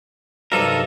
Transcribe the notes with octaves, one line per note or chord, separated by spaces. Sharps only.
G2 C3 F#3 D#4 A4 A#4